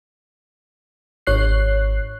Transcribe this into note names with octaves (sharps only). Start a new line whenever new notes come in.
G#1 C#5 F#6 C7